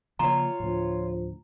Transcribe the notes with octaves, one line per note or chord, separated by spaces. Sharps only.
C#3 F3 A#3 F4 C#5 A#5
D2 A2 F3